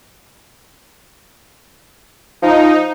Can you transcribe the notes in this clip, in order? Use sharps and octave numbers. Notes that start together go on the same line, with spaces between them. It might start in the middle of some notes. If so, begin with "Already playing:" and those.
F3 D#4